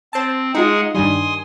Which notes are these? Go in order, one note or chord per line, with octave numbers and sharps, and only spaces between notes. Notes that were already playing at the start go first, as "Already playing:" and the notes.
C4 C5 A5
G#3 D#4 F4 G#4 F#5
G2 D#3 G3 G#5 C6 D#6